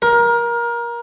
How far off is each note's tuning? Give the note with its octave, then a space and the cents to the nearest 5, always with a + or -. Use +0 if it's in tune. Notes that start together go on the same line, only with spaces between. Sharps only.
A#4 +20